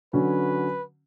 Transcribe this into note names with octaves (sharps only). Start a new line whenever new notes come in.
D3 F#3 C#4 B4